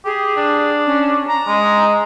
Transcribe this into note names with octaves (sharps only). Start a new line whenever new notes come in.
G4 G#4
D4
C#4
A#5
G#3